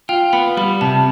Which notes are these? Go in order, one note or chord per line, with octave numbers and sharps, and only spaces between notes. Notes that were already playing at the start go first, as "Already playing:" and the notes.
F4 G5
B3 B5
G3 B5
C3 A5